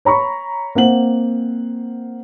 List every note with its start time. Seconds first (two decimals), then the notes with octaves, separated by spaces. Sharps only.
0.05 C#5 A#5 B5 C#6
0.75 A#3 C4 F#5 F#7